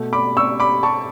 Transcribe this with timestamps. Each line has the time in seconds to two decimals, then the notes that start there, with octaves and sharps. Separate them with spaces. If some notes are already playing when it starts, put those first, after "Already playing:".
Already playing: B2 A3
0.13 B5 D6
0.37 C#6 E6
0.60 B5 D6
0.83 A5 C#6